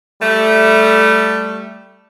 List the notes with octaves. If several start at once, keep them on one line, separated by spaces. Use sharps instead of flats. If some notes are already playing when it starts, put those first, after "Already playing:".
G3 A3